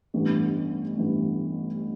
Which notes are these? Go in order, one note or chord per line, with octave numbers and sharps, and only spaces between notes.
A1 G2 E3 B3
A1 G2 E3 B3